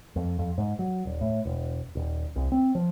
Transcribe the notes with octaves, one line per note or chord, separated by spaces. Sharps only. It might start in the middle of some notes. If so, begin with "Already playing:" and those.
F2
F2
G#2
F#3
D#1
A2
E1
D#1
C2
C4
F3